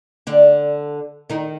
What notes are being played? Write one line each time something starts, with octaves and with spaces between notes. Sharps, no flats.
D3 D4
D#3 D#4